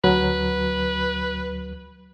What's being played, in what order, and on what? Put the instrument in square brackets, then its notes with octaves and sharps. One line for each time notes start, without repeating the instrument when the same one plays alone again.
[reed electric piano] D2 F#3 [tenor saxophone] B4